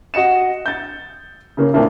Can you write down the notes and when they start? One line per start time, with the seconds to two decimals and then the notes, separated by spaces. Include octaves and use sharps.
0.14 F#4 D#5 C#7 E7
0.66 G6 A6
1.57 C#3 A#3 C#4
1.73 F2 A#2 A3 A#3 D4 E4